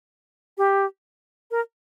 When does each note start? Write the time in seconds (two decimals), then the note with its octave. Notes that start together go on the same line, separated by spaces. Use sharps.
0.58 G4
1.51 A#4